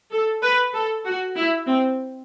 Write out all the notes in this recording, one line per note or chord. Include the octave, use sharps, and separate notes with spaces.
A4
B4
A4
F#4
E4
C4